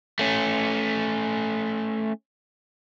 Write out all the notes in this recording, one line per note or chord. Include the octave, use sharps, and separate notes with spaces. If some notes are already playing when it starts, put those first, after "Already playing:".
A3 C#4